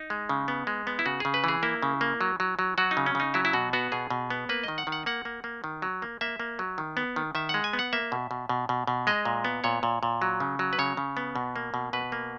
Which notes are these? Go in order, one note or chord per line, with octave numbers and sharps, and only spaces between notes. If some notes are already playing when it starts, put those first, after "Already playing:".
Already playing: D#4
G#3
C#3
B3
G#3
B3
E4
C#3 F#4
C#3 G#4
B4
E3 G#4
A#3 E4
C#3
A#3
F#3
F#3
F#3
F#3 F#4
D#4
C#3
C#4
C#3 D#4
F#3 E4
E4
B2 F#4
B3 F#4
B2 G#4
B2
B3
A#3 B4
D#3 D#5
F#5
D#3
F#5
A#3 F#5
A#3
A#3
D#3
F#3
A#3
A#3 E5
A#3
F#3
D#3
B3
D#3
D#3 E5
G#3 F#5
G#5
B3
F#5
A#3 E5
B2
B2
B2
B2
B2
G#3 D#5
A#2
B3
A#2 C#5
A#2
A#2
F#3
C#3
F#3
B4
C#3 C#5
C#3
B3
B2
A#3
B2
B2 B4
A#3